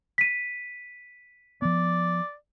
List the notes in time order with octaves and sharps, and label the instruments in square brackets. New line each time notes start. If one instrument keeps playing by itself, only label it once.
[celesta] B6 D#7
[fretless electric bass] F3 B3 [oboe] D5